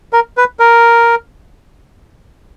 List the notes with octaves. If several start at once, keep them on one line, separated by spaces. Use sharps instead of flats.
A#4
B4
A#4